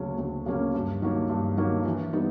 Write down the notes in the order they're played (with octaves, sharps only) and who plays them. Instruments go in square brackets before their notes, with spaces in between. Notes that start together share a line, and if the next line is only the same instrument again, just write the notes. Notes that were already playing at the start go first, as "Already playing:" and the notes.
Already playing: [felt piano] D2 C#3 F#3 A#3 C#4
D2
C#3 F#3 A#3 C#4
G2
D#3 F#3 A#3
G2
D#3 F#3 A#3
E3
G3 B3 D#4